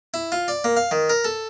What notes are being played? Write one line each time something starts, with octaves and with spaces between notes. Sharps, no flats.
E4
F4
D5
A#3
F5
D#3
A#4
A4